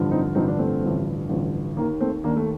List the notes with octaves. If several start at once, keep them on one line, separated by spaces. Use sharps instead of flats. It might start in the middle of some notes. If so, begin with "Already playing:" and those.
Already playing: A1 G2 D3 F3
C4 D#4
A1 G2 D3 F3 C4 D#4
D4
A3 C4
A1 G2 D3 F3
A1 G2 D3 F3
D#2 D#3 A#3
A3 C4
D#2 D#3 A#3 D4
A3